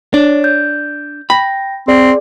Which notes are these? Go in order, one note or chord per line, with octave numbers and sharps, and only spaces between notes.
D4 C#5
G6
G5 B5 A#6
C4 G#4 D5